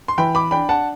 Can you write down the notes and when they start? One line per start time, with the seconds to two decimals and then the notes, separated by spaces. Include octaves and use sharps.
0.08 C6
0.18 E3 G5 B5
0.35 B5 D6
0.51 D4 G5 B5
0.69 F#5 A5